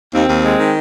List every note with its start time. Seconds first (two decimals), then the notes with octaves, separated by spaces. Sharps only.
0.14 D#2 C4
0.29 D#2
0.44 G#3
0.59 D#3